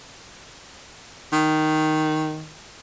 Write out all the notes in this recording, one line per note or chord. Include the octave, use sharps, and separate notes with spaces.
D#3